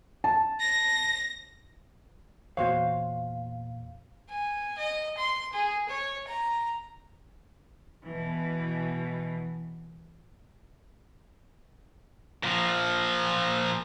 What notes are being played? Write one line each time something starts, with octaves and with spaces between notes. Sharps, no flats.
A5
A#6
E2 A#2 F#4 C5 C#5 F5
G#5
D#5
C6
G#4
C#5
A#5
B2 E3
A#2 F3